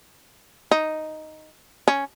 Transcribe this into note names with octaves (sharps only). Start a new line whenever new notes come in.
D#4
C#4